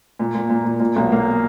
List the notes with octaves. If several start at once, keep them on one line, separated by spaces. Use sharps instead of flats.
A#2
A#2
A#2
A#2
A#2
B1
A#3